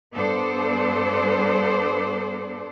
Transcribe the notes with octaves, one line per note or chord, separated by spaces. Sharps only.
G2 B3 A4 C5 D5